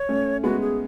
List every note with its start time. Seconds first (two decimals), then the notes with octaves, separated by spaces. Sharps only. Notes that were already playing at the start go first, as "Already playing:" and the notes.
Already playing: C#5
0.09 A3 C#4
0.43 G#3 B3 F#4
0.62 G#4